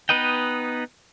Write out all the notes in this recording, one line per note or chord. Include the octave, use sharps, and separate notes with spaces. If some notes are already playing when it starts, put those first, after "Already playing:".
B3 D#4 B4 D#5 G5